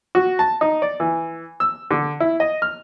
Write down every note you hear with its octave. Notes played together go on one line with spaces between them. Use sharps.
F#4
A5
D#4
D5
E3
E6
D3
E4
D#5
F6